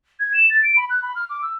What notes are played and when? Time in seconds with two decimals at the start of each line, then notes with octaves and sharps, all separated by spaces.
0.20 G#6
0.34 E7
0.50 A6
0.63 D7
0.76 B5
0.90 F#6
1.02 B5
1.15 F6
1.29 D6
1.42 E6